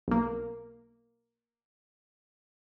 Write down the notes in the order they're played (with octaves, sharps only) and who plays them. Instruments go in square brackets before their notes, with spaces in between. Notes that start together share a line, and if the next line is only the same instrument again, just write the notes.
[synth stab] B1 A#3